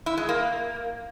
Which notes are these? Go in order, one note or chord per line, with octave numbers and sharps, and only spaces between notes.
E4
G#3
A#3